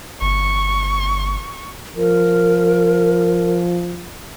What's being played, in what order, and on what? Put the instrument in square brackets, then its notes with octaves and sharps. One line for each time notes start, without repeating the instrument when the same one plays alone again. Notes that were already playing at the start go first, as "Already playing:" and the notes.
[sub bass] G1 [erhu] C#6
[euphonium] F3 [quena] A#4